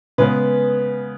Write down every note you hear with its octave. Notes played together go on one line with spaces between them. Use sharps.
C#3 G#3 B3 B4